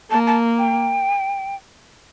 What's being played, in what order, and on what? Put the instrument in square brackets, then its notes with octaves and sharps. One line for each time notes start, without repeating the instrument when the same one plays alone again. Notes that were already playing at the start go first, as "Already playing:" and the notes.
[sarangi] A#3 [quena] A5
[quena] A5
G5